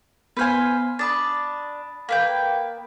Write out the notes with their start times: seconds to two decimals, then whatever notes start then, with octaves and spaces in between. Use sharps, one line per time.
0.37 B3 B4 C5 G#5 F6
0.99 D4 B5 D#6 A6
2.09 A#3 B4 G5